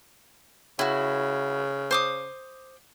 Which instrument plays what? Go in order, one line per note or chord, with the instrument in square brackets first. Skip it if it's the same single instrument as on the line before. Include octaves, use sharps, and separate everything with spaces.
[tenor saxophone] C#3 [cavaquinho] E4 F#4
[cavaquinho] C5 D6 D#6